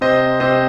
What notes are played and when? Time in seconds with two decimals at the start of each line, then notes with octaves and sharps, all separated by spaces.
0.01 C3 C5 D#5
0.40 C3 C5 D#5